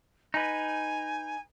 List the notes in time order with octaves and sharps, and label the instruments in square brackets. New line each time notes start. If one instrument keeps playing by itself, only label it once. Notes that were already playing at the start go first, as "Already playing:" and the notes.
[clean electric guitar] D#4 B4 [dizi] G#5